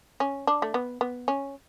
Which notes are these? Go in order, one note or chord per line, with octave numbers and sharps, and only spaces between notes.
C#4
D4
A3
B3
B3
C#4